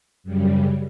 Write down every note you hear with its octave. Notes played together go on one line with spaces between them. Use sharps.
F#2 C#3 G3